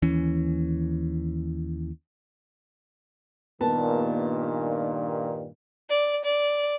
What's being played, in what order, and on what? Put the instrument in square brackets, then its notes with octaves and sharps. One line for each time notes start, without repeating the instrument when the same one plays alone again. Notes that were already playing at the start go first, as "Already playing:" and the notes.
[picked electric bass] D#2 E3 C#4
[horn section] G2 A#2 D#3 [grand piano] A#3 B3 A5
[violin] D5
D5